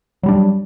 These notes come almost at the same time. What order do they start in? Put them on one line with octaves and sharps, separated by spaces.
F#3 G3 D4